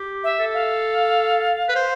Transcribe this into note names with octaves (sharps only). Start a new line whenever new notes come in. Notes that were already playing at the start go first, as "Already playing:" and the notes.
Already playing: G4
E5
A4
F5
B4
C5